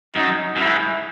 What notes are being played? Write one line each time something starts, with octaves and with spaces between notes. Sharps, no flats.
F#2 D#4
F#2
G#2 E4